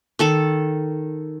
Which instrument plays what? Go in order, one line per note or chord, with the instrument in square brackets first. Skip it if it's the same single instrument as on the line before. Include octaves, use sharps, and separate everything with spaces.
[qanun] D#3 A4 A5